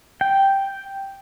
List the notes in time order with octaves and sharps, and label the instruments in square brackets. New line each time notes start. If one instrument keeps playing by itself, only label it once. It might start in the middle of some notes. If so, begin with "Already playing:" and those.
[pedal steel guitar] G5